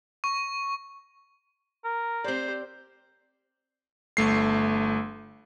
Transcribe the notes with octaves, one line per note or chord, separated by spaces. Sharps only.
C#6
A#4
C4 G4 C5 D5
G1 A3 C7